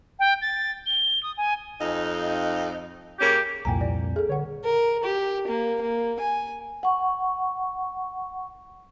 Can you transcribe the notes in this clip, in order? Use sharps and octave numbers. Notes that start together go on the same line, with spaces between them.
G5
A6
G7
D#6
G#5
F2 D#4
C#3 A#3 C#4 G4
C2 F2 A#2 G5 G#5 A#5
D5
G#4 A4
D3 C#5 F#5
A#4
G4
A#3
A#3
G#5
F#5 C#6